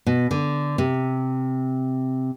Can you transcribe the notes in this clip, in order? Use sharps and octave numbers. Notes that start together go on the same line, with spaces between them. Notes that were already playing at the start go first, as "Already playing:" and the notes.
B2
D3
C3